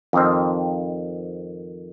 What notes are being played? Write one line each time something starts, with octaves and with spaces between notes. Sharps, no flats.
F2 D#3 C4 D#4 C5